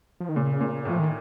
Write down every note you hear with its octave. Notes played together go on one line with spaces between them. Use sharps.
F3
D#3
A#2 C#3
A#2
A2 F3
D#3